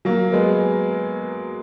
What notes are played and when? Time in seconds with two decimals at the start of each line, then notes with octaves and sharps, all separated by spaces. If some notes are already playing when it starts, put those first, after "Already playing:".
0.05 F#3 A#3
0.32 G#3 B3